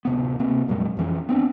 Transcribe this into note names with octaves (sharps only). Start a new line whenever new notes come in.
D1 C3 B3
C3 A#3 C4
F2 A#2 F#3 G#3
F2 E3 C#4
B3 C4 D4